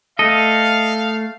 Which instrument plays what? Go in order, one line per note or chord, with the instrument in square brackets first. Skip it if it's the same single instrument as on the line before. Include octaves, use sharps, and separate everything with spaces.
[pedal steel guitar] A3 A4 [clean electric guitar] D#5 [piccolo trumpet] F5